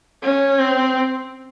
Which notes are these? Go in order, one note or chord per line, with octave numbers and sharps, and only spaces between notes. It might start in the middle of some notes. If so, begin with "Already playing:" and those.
C#4
C4